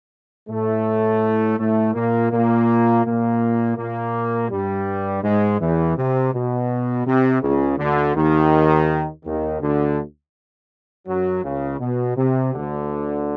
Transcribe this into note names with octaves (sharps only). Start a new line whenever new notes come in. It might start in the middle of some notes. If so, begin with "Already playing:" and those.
A2 A3
A2 A3
A#2 A#3
A#2 A#3
A#2 A#3
A#2 A#3
G2 G3
G#2 G#3
E2 E3
C3
B2
C3
C#2 C#3
D2 D3
D#2 D#3
D#2 D#3
D2 D3
F#2 F#3
C#2 C#3
B2
C3
D2 D3